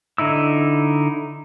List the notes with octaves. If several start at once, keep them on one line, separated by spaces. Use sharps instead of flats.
D3 D#4 E4 E6